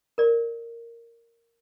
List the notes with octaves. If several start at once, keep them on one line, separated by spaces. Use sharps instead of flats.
A#4 D5